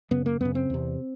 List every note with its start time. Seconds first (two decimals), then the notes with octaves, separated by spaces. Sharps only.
0.11 F#2 C#3 B3
0.26 A#3
0.41 F#2 C#3 B3
0.55 C4
0.70 E2 C3